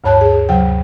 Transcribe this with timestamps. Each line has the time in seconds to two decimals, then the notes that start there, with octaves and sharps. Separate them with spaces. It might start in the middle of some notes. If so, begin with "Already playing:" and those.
0.04 D2 G2 C#5 A5 F#6
0.21 G#4
0.49 D2 C3 F#3 G5